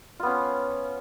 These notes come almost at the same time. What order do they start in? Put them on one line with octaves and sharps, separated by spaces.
F4 B3 C#4